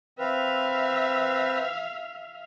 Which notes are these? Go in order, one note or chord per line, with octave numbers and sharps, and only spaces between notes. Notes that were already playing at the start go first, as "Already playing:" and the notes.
C4 B4 E5 F5